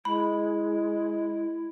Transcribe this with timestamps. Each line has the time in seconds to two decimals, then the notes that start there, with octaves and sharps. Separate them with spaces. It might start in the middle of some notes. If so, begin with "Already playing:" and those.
0.05 G#3 E4 B5